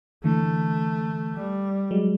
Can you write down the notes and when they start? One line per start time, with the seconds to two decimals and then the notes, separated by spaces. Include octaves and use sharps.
0.24 D3 E3 A3
1.35 G3
1.91 F#3 G#3